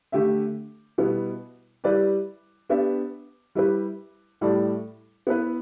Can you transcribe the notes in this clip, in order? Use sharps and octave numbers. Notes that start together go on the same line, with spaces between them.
D3 A3 G4 E5
B2 G3 B3 E4
G3 E4 G4 B4 D5
B3 D4 G4 E5
G3 E4 G4 B4
A2 G3 E4 A4 D5
B3 E4 B4